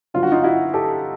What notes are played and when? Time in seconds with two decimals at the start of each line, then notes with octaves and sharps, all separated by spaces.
0.14 G2 D3 F#3 F4
0.23 F#4
0.32 D#4 F4
0.44 E4 F#4
0.74 G4 A4